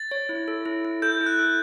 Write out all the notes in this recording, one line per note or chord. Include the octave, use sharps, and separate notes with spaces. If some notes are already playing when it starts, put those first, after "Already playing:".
Already playing: A6
C#5
E4
A4
E4
E4
A4 G6
E4
F#6
A4